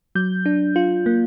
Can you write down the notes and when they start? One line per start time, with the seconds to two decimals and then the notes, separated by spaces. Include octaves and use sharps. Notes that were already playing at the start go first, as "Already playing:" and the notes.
0.15 F#3 G6
0.46 D4
0.76 F4
1.06 A#3